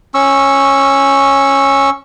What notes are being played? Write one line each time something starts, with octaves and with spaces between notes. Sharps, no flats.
C#4 C#6 E6